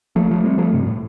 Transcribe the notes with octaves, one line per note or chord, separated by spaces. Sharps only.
F3 A3
F3 A3
G3 C4
F3 A3
G2 C3
A2